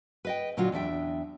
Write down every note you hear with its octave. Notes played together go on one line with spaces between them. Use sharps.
B4 D#5 G5
A#2 D3 F#3 D4 F4 F#4
E2 D4 E5 G5